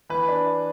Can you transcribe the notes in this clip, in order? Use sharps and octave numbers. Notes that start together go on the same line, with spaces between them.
E3 B4
D4